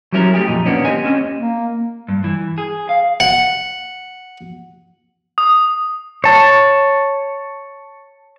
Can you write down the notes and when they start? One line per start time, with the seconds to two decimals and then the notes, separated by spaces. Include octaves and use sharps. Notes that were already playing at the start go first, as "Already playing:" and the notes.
0.13 F#3 G3 C#4 E4 A4 A#4
0.33 A3 G4 G#4
0.47 F2 A#2 D#4
0.66 D#3 A#3 B3 C#4 D4
0.85 G4 D#5 G#5
1.04 C4 C#4 D#5
1.40 A#3
2.09 G2
2.24 E3
2.58 G#4
2.89 F5
3.20 F#5
5.38 D#6
6.24 C#5 A5